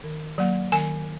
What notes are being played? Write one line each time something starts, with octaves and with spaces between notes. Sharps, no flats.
D#3
F#3 A#3
D#3 G#5